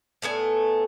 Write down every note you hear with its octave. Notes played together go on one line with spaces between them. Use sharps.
A2 A3 B3 G#5